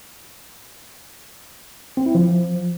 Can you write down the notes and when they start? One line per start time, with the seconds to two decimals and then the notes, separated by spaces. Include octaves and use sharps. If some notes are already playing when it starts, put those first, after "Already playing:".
1.97 C4
2.06 E4
2.15 F3